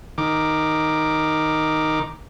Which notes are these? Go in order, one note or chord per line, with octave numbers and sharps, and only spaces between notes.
D#3 D6